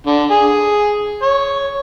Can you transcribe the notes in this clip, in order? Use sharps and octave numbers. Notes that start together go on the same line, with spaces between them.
D3
G#4
C#5